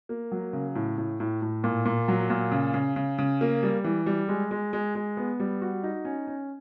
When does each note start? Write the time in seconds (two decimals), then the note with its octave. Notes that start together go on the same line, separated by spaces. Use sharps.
0.09 A#3
0.32 F#3
0.53 C#3
0.75 A2
0.98 A2
1.20 A2
1.42 A2
1.64 A#2
1.85 A#2
2.08 F#3
2.30 A#2
2.52 C#3
2.74 C#3
2.96 C#3
3.18 C#3
3.41 A#3
3.63 G3
3.84 E3
4.06 G3
4.29 G#3
4.51 G#3
4.73 G#3
4.95 G#3
5.17 B3
5.40 G3
5.61 F#4
5.83 D#4
6.05 C#4
6.27 C#4